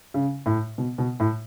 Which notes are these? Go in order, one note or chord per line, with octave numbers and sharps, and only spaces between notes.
C#3
A2
B2
B2
A2